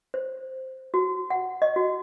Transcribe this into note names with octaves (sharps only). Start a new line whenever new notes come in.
C5
F#4
F#5
D#5
F#4